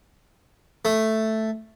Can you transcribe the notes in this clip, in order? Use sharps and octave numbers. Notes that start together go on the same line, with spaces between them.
A3